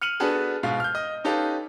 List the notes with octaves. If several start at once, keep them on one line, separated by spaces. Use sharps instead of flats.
F6 C#7 D#7 F7 F#7
B3 D4 F#4 G#4 A4 B4
G#2 B2 F5
F6 G6
D#5
C#4 D#4 G4 A4 B4 F5